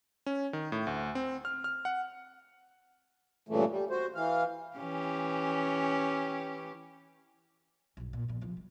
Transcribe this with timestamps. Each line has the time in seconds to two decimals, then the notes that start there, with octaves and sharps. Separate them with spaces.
0.26 C#4
0.53 D#3
0.72 A2
0.87 D2
1.15 C4
1.45 F6
1.64 F6
1.85 F#5
3.49 G2 A#2 C#3 E3 A3
3.70 G3
3.90 F#4 C5
4.15 E3 F5
4.77 E3 C#4 G4
7.97 B1 G2
8.13 A#2
8.28 F2 A#2
8.41 C2 F3
8.57 G3